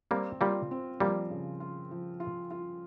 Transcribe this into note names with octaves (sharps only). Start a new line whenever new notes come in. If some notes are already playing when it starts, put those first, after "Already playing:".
G3 A#3 C4
G3 A#3 F4
C4
F3 G3 A#3
C#3
F4
F3
F4
F4